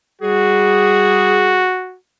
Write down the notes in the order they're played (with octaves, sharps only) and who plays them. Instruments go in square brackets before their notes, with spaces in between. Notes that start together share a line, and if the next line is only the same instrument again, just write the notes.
[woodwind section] G3 G#4 [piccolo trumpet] F#4